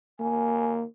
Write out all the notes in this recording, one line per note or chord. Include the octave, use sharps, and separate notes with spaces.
A#3 G#5